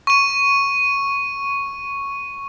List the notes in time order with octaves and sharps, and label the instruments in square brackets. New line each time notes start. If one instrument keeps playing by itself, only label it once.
[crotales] C#6 D#7